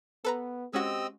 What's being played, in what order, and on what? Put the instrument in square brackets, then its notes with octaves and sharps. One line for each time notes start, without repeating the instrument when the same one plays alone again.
[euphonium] B3 [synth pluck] A4 B4 A#5
[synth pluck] G#3 C#4 F#4 [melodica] C4 D#5 E6 [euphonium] G4